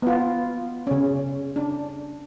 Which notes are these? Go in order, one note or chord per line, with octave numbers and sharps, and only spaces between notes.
B3 F4
C#3 C#4
D4